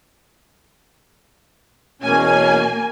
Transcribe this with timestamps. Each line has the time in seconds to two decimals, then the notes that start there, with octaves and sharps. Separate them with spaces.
2.02 E2 B2 A#3 C#4 G#5